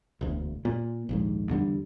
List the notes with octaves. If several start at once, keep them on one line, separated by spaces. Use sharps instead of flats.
E1 D2
A#2
A#1 D#2 G#2
E2 D3 G3